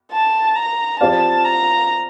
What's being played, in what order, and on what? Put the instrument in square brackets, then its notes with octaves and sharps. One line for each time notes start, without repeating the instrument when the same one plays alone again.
[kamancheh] A5
A#5
[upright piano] F3 C4 G4 D5 F5 [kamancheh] A5
[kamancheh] A#5